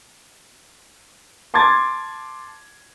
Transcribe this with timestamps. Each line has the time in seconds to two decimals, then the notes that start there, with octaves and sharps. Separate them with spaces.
1.54 A5 C6 D6 G#6 A6